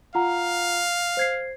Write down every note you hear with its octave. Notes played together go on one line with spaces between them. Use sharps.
F4 F5 F#5 A#5
C5 G#6 C7